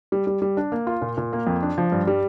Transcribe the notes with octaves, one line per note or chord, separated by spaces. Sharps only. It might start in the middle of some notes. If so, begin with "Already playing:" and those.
G3
G3
G3
D4
A#3
F4
A#2
A#2
A#3
F2
D4
F3
G2
G3